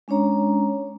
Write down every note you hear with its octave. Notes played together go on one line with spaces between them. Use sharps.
G#3 C#4 D4 C#5 A#5